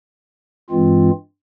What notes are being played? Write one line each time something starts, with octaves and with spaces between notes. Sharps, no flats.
G2 E3 G#3 C4 F4